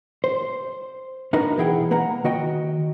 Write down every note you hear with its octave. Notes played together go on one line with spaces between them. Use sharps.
C5
D4 D#4 F#4 A#4 B4 D#5
B1 E3 E4 G#4 F#5 G5
A#3 B4 F#5 A#5
D#3 F#4 D#5 G5